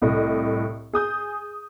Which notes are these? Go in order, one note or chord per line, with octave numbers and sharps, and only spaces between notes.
C2 A2 D#5
G#4 D#6 G6